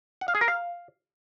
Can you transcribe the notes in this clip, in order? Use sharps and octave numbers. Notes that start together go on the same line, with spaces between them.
F#5
F5
G#4
A#4
F5